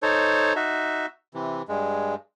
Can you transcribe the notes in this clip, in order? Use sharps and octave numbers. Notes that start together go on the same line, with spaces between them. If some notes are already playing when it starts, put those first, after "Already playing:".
D#4 A4 C5 C#5
D#4 F#4 E5
C3 E3
G2 G#3